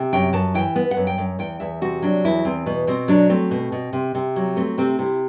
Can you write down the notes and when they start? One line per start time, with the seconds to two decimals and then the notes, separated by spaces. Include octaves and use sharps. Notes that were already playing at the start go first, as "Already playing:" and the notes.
Already playing: C3
0.13 F#2 G5
0.33 F#2 A5
0.54 E3 G5
0.76 B3
0.91 F#5
0.97 F#2
1.07 G5
1.18 F#2
1.39 E2 G5
1.60 E2 E5
1.81 C3 F#4
2.02 F#3 D4
2.24 E2 E4
2.45 E2 C4
2.66 B2 B3
2.87 B2 C4
3.08 F#3 D4
3.29 A3 C4
3.51 B2
3.72 B2
3.93 C3
4.15 C3
4.36 F#3
4.56 A3 C4
4.78 C3 C4
4.99 C3 E4